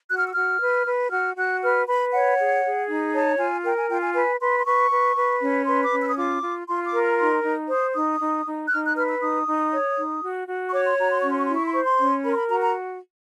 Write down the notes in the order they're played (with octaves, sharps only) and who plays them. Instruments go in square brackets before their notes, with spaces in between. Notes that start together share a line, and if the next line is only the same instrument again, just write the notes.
[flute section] F#4 F#6
F6
E6
F#4 F6
B4
B4
F#4 F6
F#4 F#6
B4 F6
B4 B5
C#5 F#5
G#4
G#4
D#4
C#5 A5
F4 G#5
A#4 G5
G#5
F4 G5
G#5
B4 G#5
B4 C6
C6
B4 C#6
B4
B4
C#4
B4 C6
D6
C#4
E6
D#6
F4 D6
F4
F4 C6
D6
A#4
A#5
D#4 C6
D#4
C5 D#6
D#4 D#6
D#4
D#4
F#6
D#4 F6
F#6
B4 F6
E6
D#4 D#6
D#4
C#5
D#4
F#4
F#4
C#6
C#5 D6
C6
F#4 A#5
C6
C#4 C#6
C6
C#6
E4 C6
C#6
C6
C5 C#6
C6
C#4
A#4 B5
C6
B5
F#4 A#5
A#5